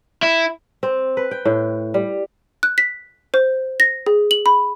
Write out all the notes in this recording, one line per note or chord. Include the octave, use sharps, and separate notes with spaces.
E4
C4
B4
G5
A2
G3
F#6
B6
C5
A#6
G#4
F#7
B5